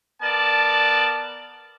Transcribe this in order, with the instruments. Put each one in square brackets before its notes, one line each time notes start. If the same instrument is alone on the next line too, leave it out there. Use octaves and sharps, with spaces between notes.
[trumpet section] B3 A#4 D5 A5